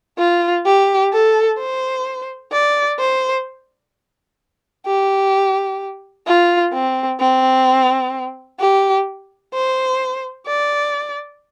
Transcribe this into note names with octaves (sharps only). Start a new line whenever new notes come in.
F4
G4
A4
C5
D5
C5
G4
F4
C4
C4
G4
C5
D5